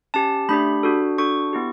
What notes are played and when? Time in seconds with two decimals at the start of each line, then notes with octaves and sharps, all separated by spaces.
0.14 C#4 G4 A5
0.49 A3 D4 G4 B5
0.83 D4 F#4 A4
1.18 D4 F#4 A4 C#6
1.53 B3 E4 G4